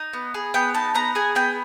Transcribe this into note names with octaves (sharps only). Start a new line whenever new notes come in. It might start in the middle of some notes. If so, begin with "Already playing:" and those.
Already playing: D#4
B3
G#4
B3 G5
D#4 A5
B3 A#5
G#4 G#5
B3 G5